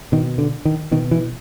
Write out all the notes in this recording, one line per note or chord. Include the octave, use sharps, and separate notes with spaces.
B2 D#3
D3
D#3
B2 D#3
E3